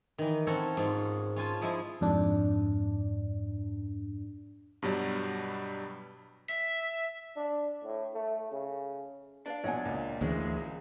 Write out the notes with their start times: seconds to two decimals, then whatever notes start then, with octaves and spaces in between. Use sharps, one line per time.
0.18 D#3 E3
0.47 C4 C#4 A4 C#5 F#5 A#5
0.77 G#2 C#4 F4
1.36 C#4 F4 G#5 A5
1.61 F3 G#3 E4
2.01 F2 G#2 D4
4.82 G2 B2 F#3 G3
6.49 E5
7.37 D4
7.84 A2
8.14 A3
8.52 C#3
9.46 D4 B4 F5
9.64 A#1 B2 C#5 F#5 G#5
9.85 C#2 A#2
10.21 D2 E3 G#3 C#4